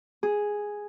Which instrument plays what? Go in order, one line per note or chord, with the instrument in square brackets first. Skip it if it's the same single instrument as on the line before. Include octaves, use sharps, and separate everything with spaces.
[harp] G#4